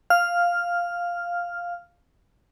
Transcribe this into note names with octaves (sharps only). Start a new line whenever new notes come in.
F5 F6